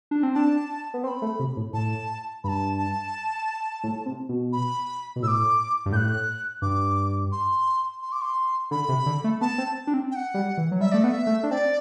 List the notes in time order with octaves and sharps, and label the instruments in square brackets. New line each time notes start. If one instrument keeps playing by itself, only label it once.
[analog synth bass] D4
C4
[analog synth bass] D4 [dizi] A5
[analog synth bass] B3
[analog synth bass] C4 [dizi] C6
[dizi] B5
[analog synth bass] A3
C3
A2
[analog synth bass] A2 [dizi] A5
[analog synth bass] G2 [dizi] A5 B5
[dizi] A5
[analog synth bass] A2
C3
B2
[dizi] B5
[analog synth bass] B2
[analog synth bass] A2 [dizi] E6
[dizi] D6
[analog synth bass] G2
[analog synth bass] A2 [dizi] G6
[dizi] F#6
[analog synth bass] G2 [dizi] D6
[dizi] C6
C6
D6
C6
[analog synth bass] D3 [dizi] B5
[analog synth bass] C3
D3
A3
[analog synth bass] B3 [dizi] A5
[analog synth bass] C4
D4
C4
[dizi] G5
F#5
[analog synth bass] G3
E3
F#3
[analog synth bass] G3 [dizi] E5
[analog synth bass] A3 [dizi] D5
[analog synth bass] B3 [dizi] F#5
[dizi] E5
[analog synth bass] A3
D4
[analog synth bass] C4 [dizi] D5